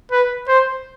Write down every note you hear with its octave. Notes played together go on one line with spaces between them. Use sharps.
B4
C5